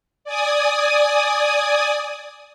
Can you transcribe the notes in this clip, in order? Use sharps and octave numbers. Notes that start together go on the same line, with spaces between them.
D5 G#5 D#6